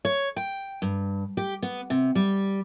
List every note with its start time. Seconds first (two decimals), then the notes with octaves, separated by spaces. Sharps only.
0.05 C#5
0.36 G5
0.82 G2
1.37 G4
1.62 B3
1.90 C3
2.15 G3